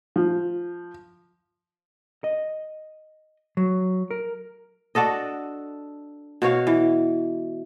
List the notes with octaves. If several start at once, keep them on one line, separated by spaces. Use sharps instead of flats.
F3
D#5
F#3
A#4
D4 F#4 A4 D#5
B2 F#4 C#5 F5
E3